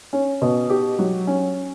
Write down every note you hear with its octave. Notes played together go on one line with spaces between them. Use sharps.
C#4
B2
G4
F#3
C#4